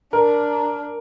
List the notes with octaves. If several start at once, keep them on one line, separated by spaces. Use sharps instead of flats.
D4 A#4